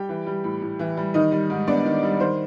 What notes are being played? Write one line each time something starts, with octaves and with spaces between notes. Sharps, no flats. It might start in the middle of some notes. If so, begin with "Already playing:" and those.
Already playing: G3 G4 G5
E3
G3
A2
A2
E3
G3
D#3 D#4 D#5
G3
G#2
B3 D4 D5
D#3
G3
D#3 C5